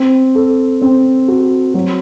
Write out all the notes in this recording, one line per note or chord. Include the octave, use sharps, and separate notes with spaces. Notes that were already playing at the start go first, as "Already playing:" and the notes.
Already playing: C4
A4
C4
F#4
F#3